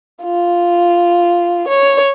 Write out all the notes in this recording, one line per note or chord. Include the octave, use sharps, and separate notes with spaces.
F4
C#5